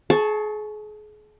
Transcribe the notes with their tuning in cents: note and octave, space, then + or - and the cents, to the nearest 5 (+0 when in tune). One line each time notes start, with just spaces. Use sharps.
G#4 +35 A5 +0 C#6 +0